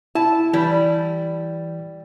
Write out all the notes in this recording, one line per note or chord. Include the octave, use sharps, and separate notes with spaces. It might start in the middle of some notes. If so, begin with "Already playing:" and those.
E4 A5
E3 G3 E4